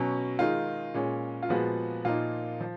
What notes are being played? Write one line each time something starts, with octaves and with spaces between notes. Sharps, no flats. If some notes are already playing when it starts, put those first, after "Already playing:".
Already playing: B2 F#3 C#4
D#3 G#3 D#4 F4
A#2 G#3 C#4
F4
A#2 F3 G#3 B3 F#4
A#2 F3 A#3 D#4 F4
F3